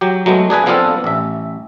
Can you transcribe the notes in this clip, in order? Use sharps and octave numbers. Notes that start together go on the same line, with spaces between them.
F#3 G4
F#3 G#3 A3 B3
D4 G#4 B4 G#5
F3 B3 C4 D4 F4 A4
A1 E5